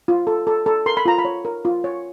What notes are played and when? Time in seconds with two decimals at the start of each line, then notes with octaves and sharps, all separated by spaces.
0.08 F4
0.27 A4
0.47 A4
0.66 A4
0.86 A#4 C6
0.97 B5
1.05 F4 A#5
1.18 B5
1.25 C#5
1.45 A#4
1.65 F4
1.84 C#5